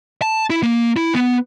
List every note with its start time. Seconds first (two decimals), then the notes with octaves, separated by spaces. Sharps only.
0.22 A5
0.50 E4
0.63 A#3
0.96 E4
1.15 B3